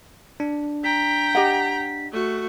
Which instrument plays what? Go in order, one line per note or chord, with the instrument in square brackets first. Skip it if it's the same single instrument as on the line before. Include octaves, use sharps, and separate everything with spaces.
[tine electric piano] D4
[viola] G5 A#5 [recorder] B6
[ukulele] G4 D#5 F#5
[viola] A3 F#4